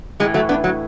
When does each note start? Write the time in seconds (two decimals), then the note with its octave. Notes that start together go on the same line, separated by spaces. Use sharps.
0.20 A2 E3 G#3
0.34 F#3 A3
0.49 B3 D4
0.64 F#3